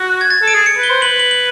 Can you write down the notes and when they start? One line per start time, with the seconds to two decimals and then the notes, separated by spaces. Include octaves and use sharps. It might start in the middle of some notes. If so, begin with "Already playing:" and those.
Already playing: F#4
0.21 G#6
0.30 A6
0.42 A4
0.48 D7
0.54 G#4
0.66 C#7
0.77 B4
0.83 G7
0.90 C5
1.02 B4 F#7
1.20 F#7
1.31 F#7